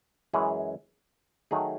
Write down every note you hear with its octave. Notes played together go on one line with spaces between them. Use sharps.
F#2 E3 G#3 C#4 G#4
D#3 F#3 A3 D#4 G#4